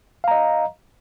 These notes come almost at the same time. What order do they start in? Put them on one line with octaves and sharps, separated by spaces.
F5 A#5 D#5